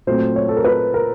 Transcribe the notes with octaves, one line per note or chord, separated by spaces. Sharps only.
A#2 F#3 A3 C4 C5
C#5
A4
A#4
B4
A#4